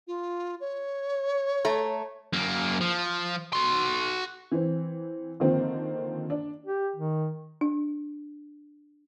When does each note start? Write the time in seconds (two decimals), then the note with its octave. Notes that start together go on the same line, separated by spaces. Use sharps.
0.07 F4
0.61 C#5
1.65 A3 A#5
2.33 F#2 A#3
2.81 F3
3.53 F#4 C6
4.52 E3 C4
5.40 D3 D#3 F3 A#3 C4
6.30 D4
6.66 G4
6.96 D#3
7.61 D4